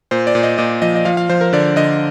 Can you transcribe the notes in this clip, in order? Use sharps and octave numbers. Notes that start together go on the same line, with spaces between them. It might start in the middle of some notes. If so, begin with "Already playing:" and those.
A#2 C5
D5
A#2
D#5
A#2 D#5
F3 D#5
D#5
F3 F5
F5
F3 C5
A#4
D3 D5
D3 D#5